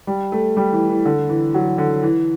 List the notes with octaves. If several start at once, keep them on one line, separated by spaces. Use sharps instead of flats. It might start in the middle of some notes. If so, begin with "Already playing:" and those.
G3
A3
G3
E3
E3
D3
E3
F#3
D3
E3